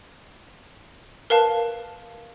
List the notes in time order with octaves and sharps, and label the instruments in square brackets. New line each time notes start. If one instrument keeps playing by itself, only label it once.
[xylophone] A#4 B4 F5 A5